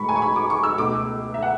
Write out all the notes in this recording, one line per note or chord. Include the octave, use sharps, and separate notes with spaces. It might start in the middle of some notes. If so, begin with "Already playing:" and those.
Already playing: A2 G#3 B5 C#6
G#5
C#6
B5
D6
C#6
E6
C#2 B2 A3 D6
E5
F#5